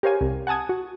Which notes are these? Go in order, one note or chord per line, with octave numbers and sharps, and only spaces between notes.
G4 A#4 C5 C#5 F5 G#5
C2
F#5 G#5 A5 D#6 G#6
F#4